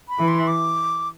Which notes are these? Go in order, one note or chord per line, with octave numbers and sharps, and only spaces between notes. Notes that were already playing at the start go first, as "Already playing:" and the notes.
B5
E3
C6
D6